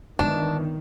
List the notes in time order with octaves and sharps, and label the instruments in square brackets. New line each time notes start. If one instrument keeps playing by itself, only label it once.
[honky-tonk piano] G1 E7 [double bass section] D#3 [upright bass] G#3 B3 [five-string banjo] D4